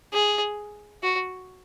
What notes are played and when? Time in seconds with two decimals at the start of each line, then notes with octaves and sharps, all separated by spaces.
0.13 G#4
1.03 F#4